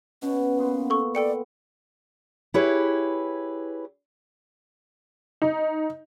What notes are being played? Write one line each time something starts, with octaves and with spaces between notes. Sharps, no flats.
B2 C#4
A#2 B3 C6
A4 C#6
A4 D5 G5 C#7
E4 G4 G#4 B4 C#5
D#4